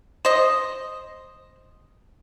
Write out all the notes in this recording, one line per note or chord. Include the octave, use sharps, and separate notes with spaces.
C5 D#5